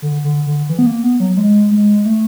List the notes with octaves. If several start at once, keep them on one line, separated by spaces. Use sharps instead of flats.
D3
D3
D3
E3
B3
A#3
B3
F#3
G#3
G#3
A3